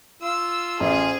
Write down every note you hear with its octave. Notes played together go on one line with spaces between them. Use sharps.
F4 E6
A1 G#4 C5